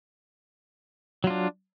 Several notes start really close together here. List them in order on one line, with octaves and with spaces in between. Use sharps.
F#3 F4 D4